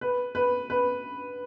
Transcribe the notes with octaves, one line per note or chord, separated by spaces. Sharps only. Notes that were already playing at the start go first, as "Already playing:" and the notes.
B4
B4
B4